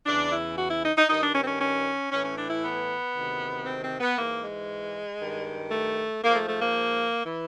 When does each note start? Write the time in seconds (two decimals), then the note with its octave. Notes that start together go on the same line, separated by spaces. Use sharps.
0.05 E2 C#3 E3 D4
0.31 E4
0.57 F#4
0.69 E4
0.83 D#4
0.96 D#4
1.08 G2 D#3 D#4
1.22 D4
1.34 C#4
1.42 C4
1.47 C#4
1.60 C#4
2.11 A2 E3 C#4
2.24 C#4
2.37 D4
2.50 E4
2.63 B3
3.14 D2 C3 D#3
3.65 C4
3.83 C4
4.00 B3
4.16 G#2 E3 A#3
4.42 G#3
5.19 G2 D#3
5.71 A3
6.22 G#2 F3 A#3
6.35 A3
6.48 A3
6.61 A#3
7.25 E3